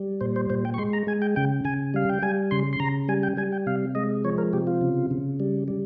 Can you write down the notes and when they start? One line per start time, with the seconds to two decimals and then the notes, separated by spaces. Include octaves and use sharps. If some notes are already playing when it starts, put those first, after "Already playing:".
Already playing: G3
0.21 A#2 C5
0.36 C5
0.50 A#2 C5
0.65 G5
0.74 C#6
0.78 G#3 C6
0.93 A#5
1.07 G#3 G#5
1.22 G5
1.36 C#3 G5
1.65 C#3 G#5
1.94 G3 F5
2.09 G5
2.22 G3 G#5
2.51 C#3 C6
2.73 C6
2.80 C#3 A#5
3.08 G3 G#5
3.23 G5
3.37 G3 G#5
3.52 G5
3.66 C3 F5
3.95 G#3 D#5
4.24 F3 C#5
4.38 A#4
4.53 C3 G4
4.67 F4
4.81 C#3
5.11 C#3
5.40 G3
5.68 G3